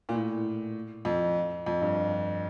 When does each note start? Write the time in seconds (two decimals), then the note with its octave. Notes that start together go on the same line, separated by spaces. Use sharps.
0.09 A#2
0.14 A2
1.05 F2
1.66 F2
1.81 G2